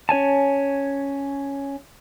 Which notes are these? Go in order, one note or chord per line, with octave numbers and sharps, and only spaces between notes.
C#4 C#5 G#5 A5